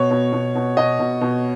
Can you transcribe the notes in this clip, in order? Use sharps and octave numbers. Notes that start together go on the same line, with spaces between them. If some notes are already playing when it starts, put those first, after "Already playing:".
Already playing: B2 C#5
B2
B2
B2
B2 D#5
B2
B2